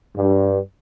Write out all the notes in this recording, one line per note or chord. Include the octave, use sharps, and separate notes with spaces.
G2